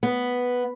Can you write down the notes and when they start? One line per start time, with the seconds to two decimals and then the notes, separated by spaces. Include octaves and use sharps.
0.03 B3